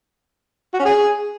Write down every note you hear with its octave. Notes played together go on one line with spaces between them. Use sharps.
F#4
C#4
G#4